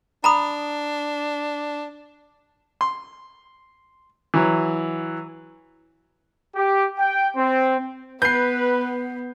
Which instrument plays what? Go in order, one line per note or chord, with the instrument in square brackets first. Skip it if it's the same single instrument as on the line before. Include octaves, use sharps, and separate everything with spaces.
[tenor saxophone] D4 [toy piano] A#5 B5 D#6
[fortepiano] C6
E3 F#3
[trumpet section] G4
G5
C4
[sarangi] B3 [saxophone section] B4 [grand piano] G6 C7